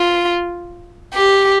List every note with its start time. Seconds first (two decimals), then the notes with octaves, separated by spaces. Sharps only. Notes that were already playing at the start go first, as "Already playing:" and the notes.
Already playing: F4
1.14 G4